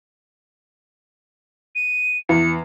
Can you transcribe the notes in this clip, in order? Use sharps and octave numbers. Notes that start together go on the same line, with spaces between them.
D#7
E2 C#7